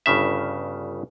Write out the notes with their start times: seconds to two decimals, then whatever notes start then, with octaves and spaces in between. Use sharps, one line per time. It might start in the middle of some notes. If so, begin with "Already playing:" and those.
0.06 G1 G2 C#3 E5